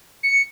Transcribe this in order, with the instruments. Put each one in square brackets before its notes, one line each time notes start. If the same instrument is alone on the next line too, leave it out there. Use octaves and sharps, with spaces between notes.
[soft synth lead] C#7